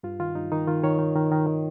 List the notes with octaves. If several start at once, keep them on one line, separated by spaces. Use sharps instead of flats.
G2 F4
D#3 F4
G2 D#4
D#3 D#4
D#3 F4
D#3 C#5
D#3
D#3
D#3
D#3